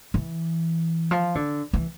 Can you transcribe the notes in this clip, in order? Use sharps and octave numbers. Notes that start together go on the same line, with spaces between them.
E3
F3
D3
E3